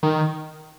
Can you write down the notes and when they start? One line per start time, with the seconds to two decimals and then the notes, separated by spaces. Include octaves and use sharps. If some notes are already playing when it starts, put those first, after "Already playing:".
0.03 D#3